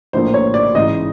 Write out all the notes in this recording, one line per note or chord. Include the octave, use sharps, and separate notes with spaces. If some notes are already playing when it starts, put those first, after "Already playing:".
A#1 A2 F3 A#3 C5
C#5
D5
A1 G#2 E3 D#5